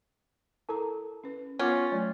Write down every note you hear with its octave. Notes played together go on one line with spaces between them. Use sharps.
E4 A4 A#4 A5 A#5
C#4 B4
B3 C#4 F4 C#5 F#5 D6
F#3 A3 C#5 D5